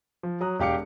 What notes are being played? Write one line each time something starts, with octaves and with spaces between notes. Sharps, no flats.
F3
F#3 A#5 D#6 F#6
E1 G4 F5 D6 C#7